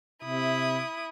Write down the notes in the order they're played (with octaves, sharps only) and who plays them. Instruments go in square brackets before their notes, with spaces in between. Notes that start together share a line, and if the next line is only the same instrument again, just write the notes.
[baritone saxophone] C3 [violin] E4 D#6